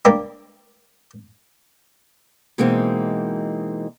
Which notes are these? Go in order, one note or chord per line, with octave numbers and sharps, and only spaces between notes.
G3 A#3 D4 G4
B2 E3 G#3 A#3 C4 D#4